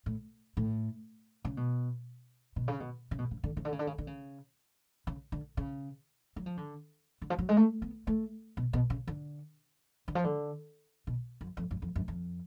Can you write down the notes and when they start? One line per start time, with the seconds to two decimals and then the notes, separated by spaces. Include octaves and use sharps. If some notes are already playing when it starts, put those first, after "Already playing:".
0.06 A2
0.57 A2
1.45 C#3
1.57 B2
2.56 B2
2.68 C#3
2.80 B2
3.11 C#3
3.19 B2
3.31 C#3
3.44 D3
3.57 C#3
3.65 D3
3.72 C#3
3.79 D3
3.87 C#3
3.98 D3
4.07 C#3
5.07 C#3
5.32 D3
5.57 C#3
6.36 F#3
6.46 F3
6.57 D3
7.22 D3
7.30 F3
7.39 F#3
7.49 G#3
7.57 A3
7.82 B3
8.07 A3
8.57 B2
8.73 B2
8.90 C#3
9.08 D3
10.08 D3
10.15 F3
10.24 D3
11.07 B2
11.41 F#2
11.57 F2
11.71 F#2
11.82 F2
11.96 F#2
12.08 F2